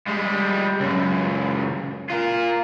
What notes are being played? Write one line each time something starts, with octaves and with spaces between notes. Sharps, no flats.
G3 G#3
C#2 F#2
F4 A#4